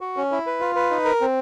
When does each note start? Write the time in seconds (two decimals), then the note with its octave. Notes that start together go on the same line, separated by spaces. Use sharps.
0.01 F#4
0.17 C#4
0.32 E4
0.46 B4
0.61 F4
0.76 B4
0.90 D#4
1.05 A#4
1.21 C4